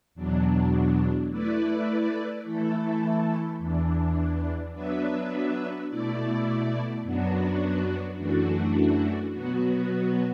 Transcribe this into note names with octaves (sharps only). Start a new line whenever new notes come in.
E2 B2 F#3 D4
A3 E4 B4 D5
E3 A3 E4 A4
E2 E3 D4
F#3 B3 D4 B4 E5
B2 A3 E4 D5
F#2 F#3 B3 D4 F#4
F#2 E3 A3 D4 F#4
B2 F#3 B3 F#4